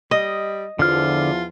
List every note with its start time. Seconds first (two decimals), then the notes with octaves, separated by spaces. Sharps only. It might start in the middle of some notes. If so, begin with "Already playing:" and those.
0.11 G3 D#5
0.79 E2 D3 F3 F4 F6